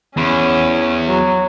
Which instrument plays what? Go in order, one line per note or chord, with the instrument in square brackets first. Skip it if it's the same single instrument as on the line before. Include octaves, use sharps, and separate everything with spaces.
[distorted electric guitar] E2 [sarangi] C#4
[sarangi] F#3